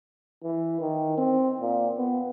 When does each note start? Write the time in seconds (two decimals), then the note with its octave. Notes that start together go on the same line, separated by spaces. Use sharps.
0.44 E3
0.81 D#3
1.18 C4
1.60 A#2
1.97 B3